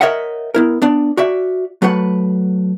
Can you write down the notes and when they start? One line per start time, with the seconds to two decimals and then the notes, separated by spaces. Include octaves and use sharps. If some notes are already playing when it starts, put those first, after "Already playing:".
0.01 A#4 C#5 D#5 E5 F#5
0.54 B3 E4 A#4
0.82 B3 D4 D5
1.17 F#4 D5 E5
1.82 F#3 A3 B4 F#5